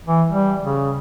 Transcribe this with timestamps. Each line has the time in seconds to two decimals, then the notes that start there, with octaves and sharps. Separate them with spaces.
0.07 E3
0.29 G3
0.62 C#3